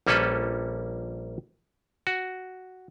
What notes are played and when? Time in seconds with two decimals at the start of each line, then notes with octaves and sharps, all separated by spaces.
0.07 A#1 G3 A#3 C#4 A4 B4
2.07 F#4